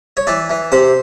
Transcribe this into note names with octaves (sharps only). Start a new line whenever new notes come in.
C#5
E3 D5
E3
C3 C5